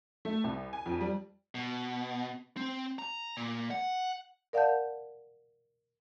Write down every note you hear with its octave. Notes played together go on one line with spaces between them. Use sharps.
A3
C2
G#5
F2
G3
B2
C4
A#5
A#2
F#5
A#4 D5 F5 F#5 A5 G6